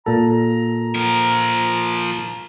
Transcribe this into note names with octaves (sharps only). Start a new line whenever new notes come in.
A#2 A4 A#5
F3 A#4